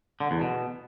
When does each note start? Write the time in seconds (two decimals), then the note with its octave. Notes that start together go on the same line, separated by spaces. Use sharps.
0.20 D3
0.31 E2
0.41 B2